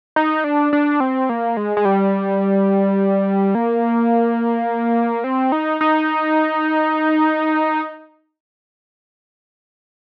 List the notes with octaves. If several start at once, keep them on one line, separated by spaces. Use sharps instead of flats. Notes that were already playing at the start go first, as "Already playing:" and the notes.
D#4
D4
D4
C4
A#3
G#3
G#3
G3
A#3
C4
D#4
D#4